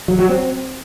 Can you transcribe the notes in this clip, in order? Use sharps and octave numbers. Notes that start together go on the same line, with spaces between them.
F#3
F#3
C4